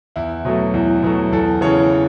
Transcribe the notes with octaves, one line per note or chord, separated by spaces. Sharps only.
E2 E4
B2 F#3 A3
E2
B2 F#3 A3
E2 A4
C#3 E3 C#5